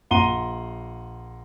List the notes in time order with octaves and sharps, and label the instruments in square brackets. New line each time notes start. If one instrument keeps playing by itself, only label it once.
[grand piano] A#1 F#5 A#5 C6 D#7 G7